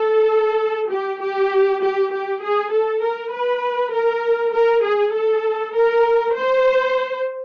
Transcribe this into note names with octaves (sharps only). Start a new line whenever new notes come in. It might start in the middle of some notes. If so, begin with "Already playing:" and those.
Already playing: A4
G4
G4
G4
G4
G#4
A4
A#4
B4
A#4
A#4
G#4
A4
A#4
C5